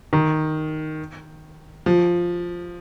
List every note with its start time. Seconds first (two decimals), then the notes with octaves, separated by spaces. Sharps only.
0.13 D#3
1.86 F3